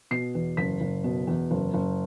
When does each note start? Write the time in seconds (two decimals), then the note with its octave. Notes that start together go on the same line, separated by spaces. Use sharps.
0.11 B2 C7
0.35 E2
0.57 F#1 B6
0.80 F#1
1.04 B2
1.27 E2
1.51 F#1
1.74 F#1